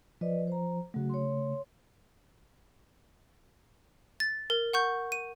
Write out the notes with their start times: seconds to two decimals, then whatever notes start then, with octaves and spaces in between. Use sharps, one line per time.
0.21 F3 B4 D5 D#5
0.47 C5 A#5
0.94 C#3 F#3 A3 F#4
1.09 C#5 C6
4.20 A6
4.50 A#4
4.73 F#5 C#6 G6
5.12 D#7